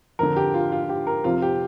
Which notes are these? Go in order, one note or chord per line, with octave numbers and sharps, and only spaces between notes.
F2 D3 A#4
G4
F4
F4
G4
A#4
F2 C3 F4
G4